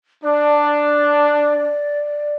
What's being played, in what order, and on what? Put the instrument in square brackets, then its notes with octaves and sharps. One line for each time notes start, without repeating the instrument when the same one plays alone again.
[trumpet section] D4 [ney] D5